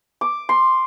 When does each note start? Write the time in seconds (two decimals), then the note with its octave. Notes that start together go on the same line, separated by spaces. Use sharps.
0.21 D6
0.49 C6